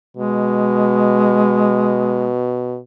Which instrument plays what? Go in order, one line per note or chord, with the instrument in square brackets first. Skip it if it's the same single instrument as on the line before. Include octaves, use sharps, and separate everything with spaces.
[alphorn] B2 [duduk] G#3